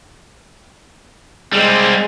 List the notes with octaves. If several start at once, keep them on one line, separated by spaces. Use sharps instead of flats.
G3 G#3 C4